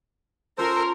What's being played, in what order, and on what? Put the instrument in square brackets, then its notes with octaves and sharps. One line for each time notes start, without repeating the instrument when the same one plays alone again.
[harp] C#4 F4 [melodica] A4 C5 [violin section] A#4